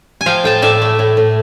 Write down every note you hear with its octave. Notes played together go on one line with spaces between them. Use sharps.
G#5
F3 F5 G5
A2 G5 A5
A2 D5 E5
A3
A2
A2